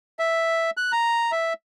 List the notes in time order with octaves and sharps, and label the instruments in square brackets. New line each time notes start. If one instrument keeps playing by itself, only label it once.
[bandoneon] E5
F#6
A#5
E5